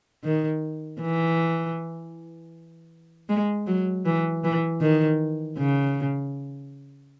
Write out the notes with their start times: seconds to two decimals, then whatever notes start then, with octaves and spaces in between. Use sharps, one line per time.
0.24 D#3
1.00 E3
3.29 G#3
3.67 F#3
4.05 E3
4.44 E3
4.81 D#3
5.58 C#3